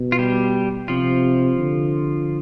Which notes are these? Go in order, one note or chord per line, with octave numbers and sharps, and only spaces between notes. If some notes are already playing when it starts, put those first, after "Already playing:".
Already playing: B2
F4
G3 G4
C3 F3 F4
D3